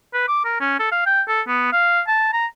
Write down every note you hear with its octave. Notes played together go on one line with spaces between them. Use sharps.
B4
D6
A#4
C#4
A4
F5
G5
A4
B3
F5
A5
A#5